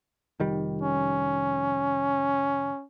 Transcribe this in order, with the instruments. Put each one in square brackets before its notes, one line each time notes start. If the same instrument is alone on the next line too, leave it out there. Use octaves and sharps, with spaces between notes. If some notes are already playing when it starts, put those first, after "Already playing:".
[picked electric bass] F1 D#3 G3
[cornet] C#4